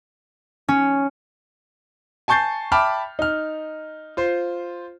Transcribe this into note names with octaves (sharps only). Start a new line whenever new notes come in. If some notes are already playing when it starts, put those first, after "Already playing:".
C#4
G#5 A5 C#6 G6 A6 C7
E5 G5 A5 B5 D6 F6
D#4 F6
F4 C5